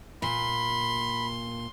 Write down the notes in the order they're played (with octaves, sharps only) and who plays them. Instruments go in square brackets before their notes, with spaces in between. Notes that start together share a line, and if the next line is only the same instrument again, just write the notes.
[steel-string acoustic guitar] A#2 [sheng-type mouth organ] B5 [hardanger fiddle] C6